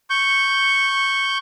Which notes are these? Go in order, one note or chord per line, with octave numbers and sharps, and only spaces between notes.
C#6 G6